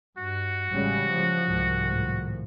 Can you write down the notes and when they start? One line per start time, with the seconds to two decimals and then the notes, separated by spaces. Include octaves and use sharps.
0.18 G2 F#4
0.72 A1 C#3 G3 G#3
1.08 F3
1.45 C2 G#2 D#3
1.88 A2 F3